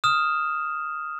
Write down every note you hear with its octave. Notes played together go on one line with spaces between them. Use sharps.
D#6 F6 E7